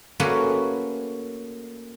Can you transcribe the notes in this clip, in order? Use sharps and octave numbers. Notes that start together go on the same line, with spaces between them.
A3 A#3 C#4 F#4 G#4 B4